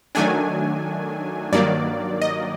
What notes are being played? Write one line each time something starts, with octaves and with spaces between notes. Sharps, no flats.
D#3 F#3 A3 D4 G#5
G2 D#3 F#3 A#3 D5
D#5